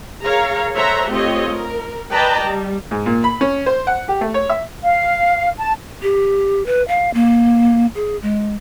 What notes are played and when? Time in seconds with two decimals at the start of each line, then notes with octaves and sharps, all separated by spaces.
0.23 G#4 A#4 C#5 F5 A#5
0.76 A4 C5 C#5 E5 F#5 A#5
1.10 A3 C4 F4 G4 C#5 D#5
1.52 A#4
2.12 B4 D5 D#5 G5 A5 A#5
2.45 G3
2.91 G#2
3.06 A#2
3.24 B5
3.41 C#4
3.66 C5
3.87 F#5
4.08 G4
4.21 A3
4.34 C#5
4.49 E5
4.82 F5
5.58 A5
6.02 G4
6.66 B4
6.88 F5
7.14 A#3
7.95 G#4
8.22 G#3